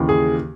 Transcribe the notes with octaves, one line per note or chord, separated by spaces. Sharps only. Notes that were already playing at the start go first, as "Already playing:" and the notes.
Already playing: D#2 C#3 E3
G#4